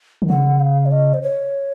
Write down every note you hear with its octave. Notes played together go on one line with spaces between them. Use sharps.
D#3
C#3 F#5
F5
C#5
D#5
C5
C#5